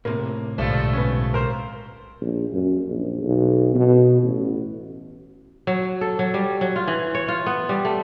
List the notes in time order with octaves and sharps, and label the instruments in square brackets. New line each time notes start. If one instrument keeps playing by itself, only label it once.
[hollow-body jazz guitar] A2 C3 [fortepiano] A#3
[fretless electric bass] B1 G#2 D3 [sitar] F3 G3 A3
[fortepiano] B3 C#4
A#4 C5
[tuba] A#1
F#2
A#1
B1
B2
A1
[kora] F#3
A4
F#3
G3
F#3
F4
E3
C#5
F4
B3
G3
A3